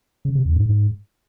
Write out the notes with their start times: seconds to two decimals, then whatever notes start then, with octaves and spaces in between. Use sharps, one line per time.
0.25 C#3
0.35 C3
0.45 E2
0.55 G#2
0.66 G#2